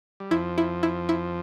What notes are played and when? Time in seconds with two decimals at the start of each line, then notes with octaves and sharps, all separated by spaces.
0.20 G3
0.31 F2 F3 E4
0.58 E4
0.83 E4
1.09 E4